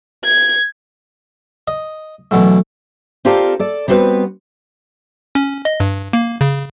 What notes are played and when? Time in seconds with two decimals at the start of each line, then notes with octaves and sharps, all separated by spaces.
0.24 G#6
1.68 D#5
2.31 B2 E3 F#3 A3
3.25 C4 F4 G4 A4 A#4 D5
3.59 A4 D5
3.88 G3 B3 C4 F#4 B4
5.35 C#4
5.65 D#5
5.80 G2
6.13 A#3
6.41 C#3